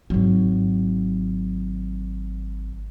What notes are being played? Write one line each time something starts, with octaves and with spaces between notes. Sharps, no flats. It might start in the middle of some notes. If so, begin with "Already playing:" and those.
G#1 F#3